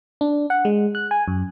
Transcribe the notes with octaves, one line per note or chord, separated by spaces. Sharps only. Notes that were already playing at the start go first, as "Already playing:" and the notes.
D4
F#5
G#3
F#6
G#5
F#2